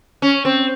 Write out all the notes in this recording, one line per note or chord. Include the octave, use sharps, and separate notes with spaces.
C#4
C4